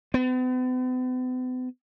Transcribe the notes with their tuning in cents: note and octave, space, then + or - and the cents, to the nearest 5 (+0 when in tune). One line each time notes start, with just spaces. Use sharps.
B3 +45